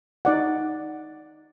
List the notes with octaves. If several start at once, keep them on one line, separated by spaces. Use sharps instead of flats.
D#4 D5 F#5